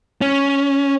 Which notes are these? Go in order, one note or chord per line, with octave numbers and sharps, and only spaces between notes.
C#4